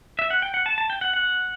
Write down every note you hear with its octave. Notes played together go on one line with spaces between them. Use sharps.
E5
F#5
G5
F#5
A5
A5
G5
F#5
F#5